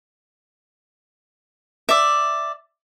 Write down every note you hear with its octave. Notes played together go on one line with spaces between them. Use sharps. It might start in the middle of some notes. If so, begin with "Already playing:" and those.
D5 E5